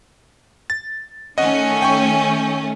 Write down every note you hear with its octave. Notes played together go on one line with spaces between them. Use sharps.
A6
D#3 A3 C#4 D#5 F#5
G5 C#6